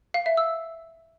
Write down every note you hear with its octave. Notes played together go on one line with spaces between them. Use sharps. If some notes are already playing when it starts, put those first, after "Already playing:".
F5
E5
E6